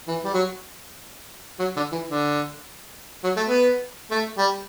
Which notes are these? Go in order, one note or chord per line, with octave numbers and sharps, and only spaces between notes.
E3
G3
F#3
F#3
D3
E3
D3
F#3
A3
B3
A3
G3